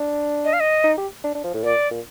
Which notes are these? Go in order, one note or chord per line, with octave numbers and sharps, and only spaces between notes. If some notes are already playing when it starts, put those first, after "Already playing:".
Already playing: D4
D#5
F5
D#5
D#4
G4
D4
D4
F3
A2
A#2 D5
A#2